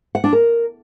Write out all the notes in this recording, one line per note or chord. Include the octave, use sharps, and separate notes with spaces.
F#5
D4
A#4